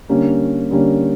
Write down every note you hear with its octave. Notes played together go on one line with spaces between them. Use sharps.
D3 G3 A#3 C#4
D3 G3 A#3 C#4